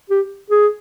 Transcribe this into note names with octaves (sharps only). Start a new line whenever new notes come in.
G4
G#4